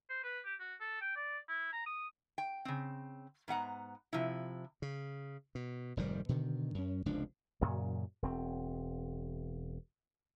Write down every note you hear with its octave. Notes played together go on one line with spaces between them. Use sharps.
C5
B4
G4
F#4
A4
G5
D5
E4
A#5
D#6
G5
C#3 C4
G#2 B3 F#5 A#5
C3 F3 E4
C#3
B2
F1 G#2 D#3 G3
B2 D3 D#3
F#2 C#4
F1 C#2 F3 D4
F#2 A#2 C#3 F#3
E1 C4